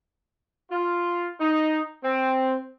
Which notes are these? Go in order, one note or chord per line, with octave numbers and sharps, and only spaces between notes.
F4
D#4
C4